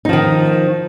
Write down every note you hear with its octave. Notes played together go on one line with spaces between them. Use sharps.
D#3 F3 D#4